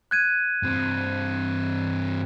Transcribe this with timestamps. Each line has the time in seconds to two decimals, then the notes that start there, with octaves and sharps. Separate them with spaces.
0.11 F#6 G#6 D#7
0.63 G2 C4